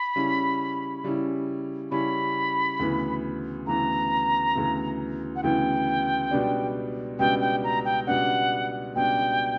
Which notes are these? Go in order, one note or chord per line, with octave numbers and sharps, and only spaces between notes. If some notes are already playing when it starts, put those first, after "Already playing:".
Already playing: B5
C#3 G3 C#4 E4
C#3 G3 C#4 E4
C#3 G3 C#4 E4 B5
D2 C#3 E3 B3 E4
D2 C#3 E3 B3 E4 A#5
D2 C#3 E3 B3 E4
F#5
D2 C#3 E3 B3 E4 G5
C#2 B2 G3 B3 D4
C#2 B2 G3 B3 D4 G5
G5
A#5
G5
C#2 B2 G3 B3 D4 F#5
C#2 B2 G3 B3 D4 G5